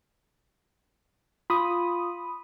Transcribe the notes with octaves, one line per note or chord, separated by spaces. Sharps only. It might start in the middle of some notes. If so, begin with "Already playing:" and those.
F4 B5 D#6